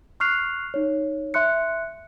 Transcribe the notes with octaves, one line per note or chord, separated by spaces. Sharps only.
C#6 F6 F#6 C7 F7
D#4 C#5
E5 C6 F#6 C#7